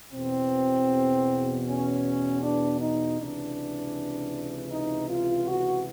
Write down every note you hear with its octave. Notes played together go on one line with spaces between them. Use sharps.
E2 B2 C4
C#4
D4
D#4
C#2 C3 E3 D4
D#4
F4
F#4